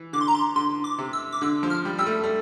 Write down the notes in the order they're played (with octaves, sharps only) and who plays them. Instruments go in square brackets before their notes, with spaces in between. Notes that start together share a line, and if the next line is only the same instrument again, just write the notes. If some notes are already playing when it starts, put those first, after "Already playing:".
Already playing: [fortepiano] E3
[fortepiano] D3 [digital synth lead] D6
[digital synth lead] C6
A#5
C6
[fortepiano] D3 [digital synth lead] C6
[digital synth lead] D6
[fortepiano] C3
[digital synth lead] E6
D6
[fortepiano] D3 [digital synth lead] E6
[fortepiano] F3
[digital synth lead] F6
[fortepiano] G3
[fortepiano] G3 [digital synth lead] E6
[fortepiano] A3
A3